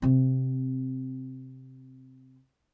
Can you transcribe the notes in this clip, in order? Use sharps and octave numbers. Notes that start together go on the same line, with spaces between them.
C3 C4